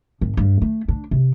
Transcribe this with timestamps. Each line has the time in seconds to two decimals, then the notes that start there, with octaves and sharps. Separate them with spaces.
0.21 G#1
0.37 G2
0.62 A3
0.88 D4
1.11 C3